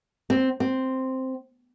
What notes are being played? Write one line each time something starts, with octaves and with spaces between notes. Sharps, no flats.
C4
C4